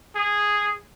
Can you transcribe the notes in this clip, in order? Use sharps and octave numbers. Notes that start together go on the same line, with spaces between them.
G#4